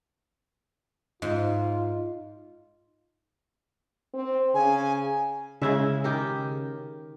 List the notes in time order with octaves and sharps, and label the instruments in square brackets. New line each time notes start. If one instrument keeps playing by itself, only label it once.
[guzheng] G#2 [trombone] F4
[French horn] C4
[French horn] C#3 [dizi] G#5
[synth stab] C#3 [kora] G#3 E4 E5
[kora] D#3 G4 A#4